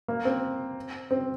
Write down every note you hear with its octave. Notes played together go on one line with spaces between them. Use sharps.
A#3
C4
C4